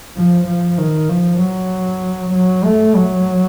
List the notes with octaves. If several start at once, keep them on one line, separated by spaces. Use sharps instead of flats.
F3
F3
D#3
F3
F#3
F#3
A3
F#3